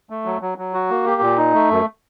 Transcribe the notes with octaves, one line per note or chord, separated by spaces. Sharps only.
A3
F#3
F#3
F#3
F#4
A#3
G4
A#2
D#4
A3
F#2